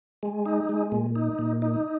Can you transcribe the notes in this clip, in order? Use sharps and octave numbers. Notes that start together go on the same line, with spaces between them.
G#3
D#4
G#3
A#2
D#4
A#2
D#4